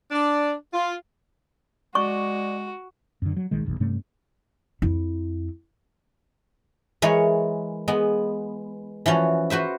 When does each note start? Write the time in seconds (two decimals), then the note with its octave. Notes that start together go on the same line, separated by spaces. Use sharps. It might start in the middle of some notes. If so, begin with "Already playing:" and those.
0.11 D4
0.74 F4
1.95 G#3 F#4 D5 C#6
3.22 F#2 D3
3.37 F#3
3.51 A#1 D#3 G#3
3.65 F#1 B1 E2
3.80 G2 C3 A3 C#4
4.82 F2 E4
7.02 E3 G#3 A#4 C#5
7.88 G#3 B3
9.06 E3 F3 C#4 F#4
9.50 F#4 B4 C5 E5